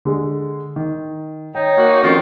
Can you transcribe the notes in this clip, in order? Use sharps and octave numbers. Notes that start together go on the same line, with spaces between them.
D3 G#3
D#3
D#4 C#5 G5
A#3 F#4
F2 D#3 C#4 F4